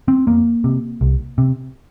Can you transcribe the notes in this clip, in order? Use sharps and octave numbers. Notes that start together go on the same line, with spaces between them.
C4
F2 A#3
C3
C2
C3